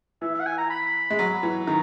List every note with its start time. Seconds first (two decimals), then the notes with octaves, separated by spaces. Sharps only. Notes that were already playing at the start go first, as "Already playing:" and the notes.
0.22 E3 E5
0.34 E5
0.40 F#5
0.47 G#5
0.58 A#5
0.70 B5
1.10 G#3
1.19 F#3
1.43 E3
1.67 D#3 A#5